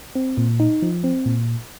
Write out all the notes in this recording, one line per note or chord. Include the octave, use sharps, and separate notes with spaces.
C4
A#2
D#4
F3
C4
A#2